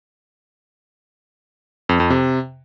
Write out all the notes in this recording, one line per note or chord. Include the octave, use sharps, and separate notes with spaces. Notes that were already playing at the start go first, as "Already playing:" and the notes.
F2
F2
C3